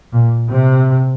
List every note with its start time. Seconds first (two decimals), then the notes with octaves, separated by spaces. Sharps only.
0.14 A#2
0.49 C3